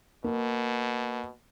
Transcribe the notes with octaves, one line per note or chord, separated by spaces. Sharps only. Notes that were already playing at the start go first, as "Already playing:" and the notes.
B2 A#3